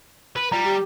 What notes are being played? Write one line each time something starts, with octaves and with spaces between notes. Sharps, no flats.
B4
G3 F4 A#5
G4